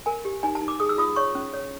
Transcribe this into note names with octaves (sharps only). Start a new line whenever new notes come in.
A#4 G#5
G4
D#4 G#5
A5
D#4
D6
G#4 D#6
E6
F4 D#6
C#5 C#6
C#4
C#5